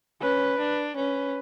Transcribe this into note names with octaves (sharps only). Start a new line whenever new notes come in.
C#4 B4
D4
C#4 B4